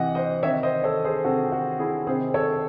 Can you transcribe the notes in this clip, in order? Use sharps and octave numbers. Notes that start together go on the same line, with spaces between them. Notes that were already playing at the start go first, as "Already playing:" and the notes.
Already playing: C3 E3 D#5 F#5
C5 D#5
C3 D#3 C#5 E5
C5 D#5
A4 C#5
G#4 C5
C3 D#3 F#4 A4
F#4 A4
E4 G#4
C3 D#3 G#4 C5
A4 C#5